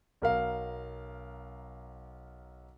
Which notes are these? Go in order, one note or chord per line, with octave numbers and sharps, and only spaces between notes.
B1 A#4 F5